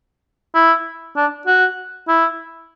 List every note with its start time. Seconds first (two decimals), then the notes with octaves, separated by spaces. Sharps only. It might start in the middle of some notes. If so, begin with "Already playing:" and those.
0.54 E4
1.16 D4
1.47 F#4
2.08 E4